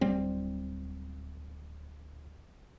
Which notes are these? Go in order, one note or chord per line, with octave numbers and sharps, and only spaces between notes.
D1 G3 C4